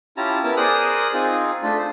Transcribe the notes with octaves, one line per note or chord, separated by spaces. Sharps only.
C#4 E4 F4 G4 A5 A#5
B3 E4 A#4 A5
G#4 A#4 C5 D5 D#6 F#6
C4 D#4 F4 G#4
A3 D4 F4 A4
C5